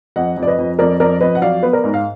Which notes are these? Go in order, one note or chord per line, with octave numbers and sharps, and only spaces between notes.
F2 D#5 F#5
F2
D5
B4 D#5
F2
F2 A#4 D5
F2 A#4 D5
F2 B4 D#5
F#5
F#3 D5 F5
B3 B4
A#4 D5
G#2
F5